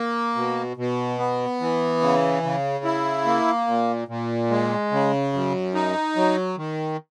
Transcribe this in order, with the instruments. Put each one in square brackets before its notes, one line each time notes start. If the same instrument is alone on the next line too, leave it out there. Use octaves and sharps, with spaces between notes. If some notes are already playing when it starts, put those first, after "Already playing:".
Already playing: [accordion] A#3
B2
B2
B3
E3
C#3
C#3
E4
A#3
A#2
A#2
G#3
C#3
F#2
D#4
F#3
D#3